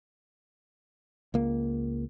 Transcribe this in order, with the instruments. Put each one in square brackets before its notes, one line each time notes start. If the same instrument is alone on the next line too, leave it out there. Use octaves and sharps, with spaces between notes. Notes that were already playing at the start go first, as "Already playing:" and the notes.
[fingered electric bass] C#2 A#3